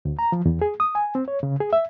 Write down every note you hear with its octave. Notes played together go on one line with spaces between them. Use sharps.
D2
A#5
F3
E2
G#4
D#6
G#5
C4
C#5
C#3
G#4
E5